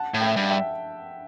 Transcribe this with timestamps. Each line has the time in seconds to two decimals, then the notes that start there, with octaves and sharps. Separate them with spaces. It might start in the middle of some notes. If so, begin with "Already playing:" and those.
Already playing: F#5 A5
0.14 A2
0.21 E5 G5
0.36 G2
0.50 E5 G5